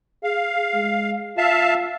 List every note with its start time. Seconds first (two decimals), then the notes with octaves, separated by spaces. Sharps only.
0.24 G#4 F5
0.75 G#3
1.38 F4 E5 F5 A5